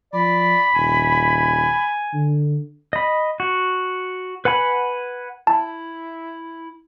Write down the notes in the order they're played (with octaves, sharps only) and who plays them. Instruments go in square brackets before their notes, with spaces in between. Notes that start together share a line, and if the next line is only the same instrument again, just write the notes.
[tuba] F3 [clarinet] D5 [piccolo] B5
[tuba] D#1 [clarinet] G#5
[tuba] D3
[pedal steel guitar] D#5 B5
F#4
B4 F#5 G#5 B5
[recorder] E4 [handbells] A5